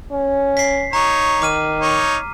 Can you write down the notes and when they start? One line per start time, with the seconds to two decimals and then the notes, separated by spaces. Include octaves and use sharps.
0.12 C#4
0.57 B6 C7
0.93 D#4 C#5 A#5
1.42 D#3 D6 F6 D#7
1.81 D#4 C#5